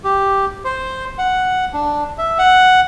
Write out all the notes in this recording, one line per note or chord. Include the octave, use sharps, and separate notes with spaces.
G4
C5
F#5
D4
E5
F#5